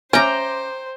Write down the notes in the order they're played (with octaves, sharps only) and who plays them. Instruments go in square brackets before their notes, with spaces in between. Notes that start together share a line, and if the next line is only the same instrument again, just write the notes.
[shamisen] C#4 [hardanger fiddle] C5 [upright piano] E5 D6 [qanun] G5 A#5